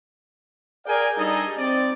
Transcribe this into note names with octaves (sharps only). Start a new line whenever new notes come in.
G#4 A#4 D5 F5 G5 G#5
G3 D4 D#4 G#4 A4 D#5
C4 D5